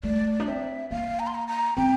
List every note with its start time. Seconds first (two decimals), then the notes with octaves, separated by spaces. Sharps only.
0.03 A3 D5
0.40 D4
0.47 C4 E5
0.90 A#3 F5
1.19 A#5
1.27 C6
1.34 A#5
1.48 A#5
1.77 C4 G5